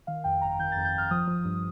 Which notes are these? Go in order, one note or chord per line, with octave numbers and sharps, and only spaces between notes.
D#3 F5
F2 G5
G1 A#5
D#3 G6
F2 A6
G6
G1 F6
F3 D#6
F3
G2